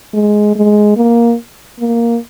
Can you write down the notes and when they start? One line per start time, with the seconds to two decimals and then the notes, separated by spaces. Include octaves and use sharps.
0.14 G#3
0.56 G#3
0.97 A#3
1.80 A#3